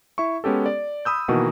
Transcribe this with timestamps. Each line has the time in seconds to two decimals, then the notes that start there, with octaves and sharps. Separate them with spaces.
0.18 E4 E5 C#6
0.44 G#3 B3 C#4 G4 A4
0.66 D5
1.05 B5 D#6 E6 G6
1.28 B2 D#3 E3 A#3 F#4